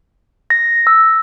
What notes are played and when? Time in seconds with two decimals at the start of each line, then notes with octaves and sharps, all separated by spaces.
0.50 A#6
0.87 E6